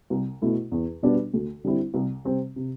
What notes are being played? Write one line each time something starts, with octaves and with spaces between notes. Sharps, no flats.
C2
B2 A3 E4
E2
B2 G3 B3 D4
D2
D3 G3 C4 E4
C2
C3 G3 C4
C3